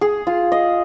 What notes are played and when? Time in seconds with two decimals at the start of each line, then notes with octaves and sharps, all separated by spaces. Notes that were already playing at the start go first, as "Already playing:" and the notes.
0.01 G#4
0.27 F4
0.52 D#5